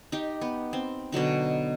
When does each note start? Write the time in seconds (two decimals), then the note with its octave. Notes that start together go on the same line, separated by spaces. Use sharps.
0.12 D#4 G4
0.41 B3
0.73 C4
1.12 B2 D3 F#3 D#4